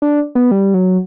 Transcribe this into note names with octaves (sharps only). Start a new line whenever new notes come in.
D4
B3
G3
F#3